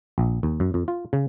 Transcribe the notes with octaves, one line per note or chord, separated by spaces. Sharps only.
A#1
D#2
F#2
F2
F4
C#3